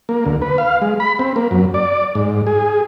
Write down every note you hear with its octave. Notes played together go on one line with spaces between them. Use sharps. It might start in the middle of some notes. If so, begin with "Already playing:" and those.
A#3
D2
B4
F5
G#3
B5
C4
A#3
F#2
D5
G#2
G#4